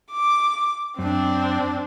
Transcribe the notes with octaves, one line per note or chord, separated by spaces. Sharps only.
D6
F#2 C4 D4